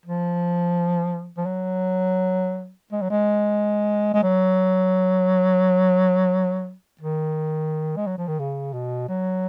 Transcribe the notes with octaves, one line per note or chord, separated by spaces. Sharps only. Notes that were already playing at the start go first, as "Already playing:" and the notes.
F3
F3
F#3
G#3
F#3
G#3
G#3
F#3
D#3
G#3
F#3
F3
D#3
C#3
B2
F#3